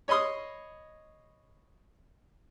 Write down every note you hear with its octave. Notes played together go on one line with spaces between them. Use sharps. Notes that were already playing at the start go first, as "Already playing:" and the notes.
C#5 D#5 B5 C6 D#6